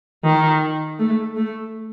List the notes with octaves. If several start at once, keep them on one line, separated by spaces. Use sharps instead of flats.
D#3
A3
A3